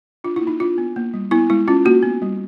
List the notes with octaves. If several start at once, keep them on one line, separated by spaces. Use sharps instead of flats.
D4 F4
E4
A#3
D#4
D4 F4
B3
A#3
G3
B3 E4
G#3 E4
C#4 F4
A#3 F#4
B3
G3